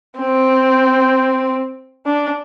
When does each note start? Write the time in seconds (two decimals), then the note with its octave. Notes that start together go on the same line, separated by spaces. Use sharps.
0.19 C4
2.07 D4